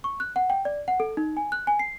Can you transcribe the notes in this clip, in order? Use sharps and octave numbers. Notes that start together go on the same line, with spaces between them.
C#6
F#6
F#5
G5
D5
F#5
A4
D#4
G#5
F#6
G#5
C7